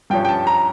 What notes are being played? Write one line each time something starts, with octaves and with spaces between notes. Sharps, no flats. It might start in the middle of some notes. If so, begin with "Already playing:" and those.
G2 F3 C#4 G5
G5
A5
A#5